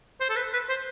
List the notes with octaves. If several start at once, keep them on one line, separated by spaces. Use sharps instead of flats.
C5
A4
B4
B4
C5